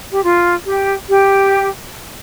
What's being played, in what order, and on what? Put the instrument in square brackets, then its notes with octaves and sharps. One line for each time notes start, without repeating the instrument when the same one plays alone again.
[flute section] G4
F4
G4
G4